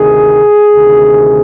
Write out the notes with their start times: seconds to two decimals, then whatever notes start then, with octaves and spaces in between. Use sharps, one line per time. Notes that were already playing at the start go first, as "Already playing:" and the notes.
Already playing: D2 C3 D#3 G#4
0.72 D2 C3 D#3